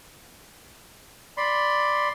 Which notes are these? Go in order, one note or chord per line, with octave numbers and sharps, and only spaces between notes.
D5 B5 C6